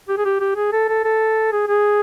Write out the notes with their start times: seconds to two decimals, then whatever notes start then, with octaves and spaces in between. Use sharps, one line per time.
0.09 G4
0.18 G#4
0.25 G4
0.40 G4
0.56 G#4
0.73 A4
0.88 A4
1.05 A4
1.52 G#4
1.68 G#4